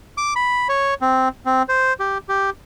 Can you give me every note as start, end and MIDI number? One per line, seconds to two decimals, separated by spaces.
0.18 0.34 86
0.36 0.68 83
0.69 0.94 73
1.01 1.29 60
1.46 1.63 60
1.69 1.94 72
2.00 2.18 67
2.29 2.50 67